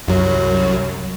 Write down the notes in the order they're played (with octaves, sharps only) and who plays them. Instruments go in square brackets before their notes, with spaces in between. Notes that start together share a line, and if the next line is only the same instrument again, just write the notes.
[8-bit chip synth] C2 F#2 F#3